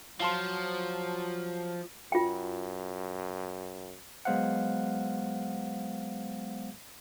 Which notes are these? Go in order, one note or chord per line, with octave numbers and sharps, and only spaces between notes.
F3 F#3 F5 A5 C6
F#2 F4 G5
F#3 G#3 B3 C5 F5 F#5